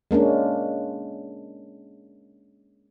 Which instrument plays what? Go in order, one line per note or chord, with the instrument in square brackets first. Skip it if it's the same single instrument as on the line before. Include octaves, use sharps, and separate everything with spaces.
[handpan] G#3 A#3 C#4 D4